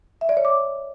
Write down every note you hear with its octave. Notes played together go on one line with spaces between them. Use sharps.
E5
D5
C#5
D6